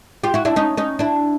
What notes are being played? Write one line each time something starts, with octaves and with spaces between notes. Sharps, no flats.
F4 G4
E4 F#4
D4 E4
C#4 D#4
C#4 D#4
D4 E4